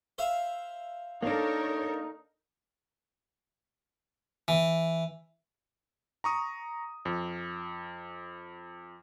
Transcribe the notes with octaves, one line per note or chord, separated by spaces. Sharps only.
C5 E5 F5
A#3 D4 D#4 A4 A#4 C#5
E3
A#5 C#6 D#6
F2